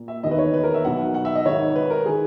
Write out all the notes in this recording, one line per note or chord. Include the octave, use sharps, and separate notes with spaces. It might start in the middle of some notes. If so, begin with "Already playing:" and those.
Already playing: A#2
E5
E1 D#2 D#3 D#5
B4
C#5
B4
A#4
E5
B1 B2 F#5
F#5
E5
D#5
G#1 G#2 D#3 C#5
B4
A#4
D#3 G#4